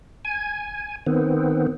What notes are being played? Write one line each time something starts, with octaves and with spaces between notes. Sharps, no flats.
G#5
D#3 B3 C4